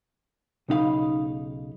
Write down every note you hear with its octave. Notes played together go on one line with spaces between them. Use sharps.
B1 C#3 D#4 F4 F5 B5